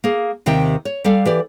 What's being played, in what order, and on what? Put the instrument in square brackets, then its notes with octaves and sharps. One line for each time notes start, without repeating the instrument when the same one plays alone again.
[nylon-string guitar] A#3 G#4
D#2 C3 D#3 E5 G5
C#5
G3 A4 D5 F5
E3 G4 D5